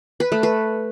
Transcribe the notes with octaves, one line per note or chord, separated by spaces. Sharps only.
B4
A3
B4